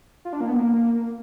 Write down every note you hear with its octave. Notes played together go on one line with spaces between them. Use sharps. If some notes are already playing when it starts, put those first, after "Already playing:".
F4
D4
A#3
B3
A#3